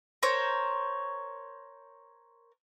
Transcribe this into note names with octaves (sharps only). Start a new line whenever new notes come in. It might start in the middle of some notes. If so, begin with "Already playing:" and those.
A#4 C5 C#5